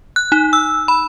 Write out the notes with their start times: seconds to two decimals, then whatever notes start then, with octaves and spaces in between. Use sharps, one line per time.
0.16 F#6
0.32 D#4
0.53 E6
0.88 B5